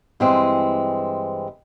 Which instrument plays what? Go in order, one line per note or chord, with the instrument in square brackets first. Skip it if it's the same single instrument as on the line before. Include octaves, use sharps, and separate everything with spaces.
[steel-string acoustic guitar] G2 E3 G#3 C4